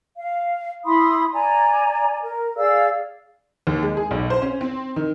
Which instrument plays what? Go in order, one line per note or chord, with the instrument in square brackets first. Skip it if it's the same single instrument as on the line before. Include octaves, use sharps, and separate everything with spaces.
[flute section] F5
E4 B5 C6 D#6
D5 G#5 A#5
A#4
G#4 D5 F5 E6
[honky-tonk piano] D#2
G#3
G#4
B1
C5
C#4
C4
D#3